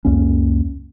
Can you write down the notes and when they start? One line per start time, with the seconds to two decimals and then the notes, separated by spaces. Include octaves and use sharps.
0.05 C#2 F#2 A#3 C#4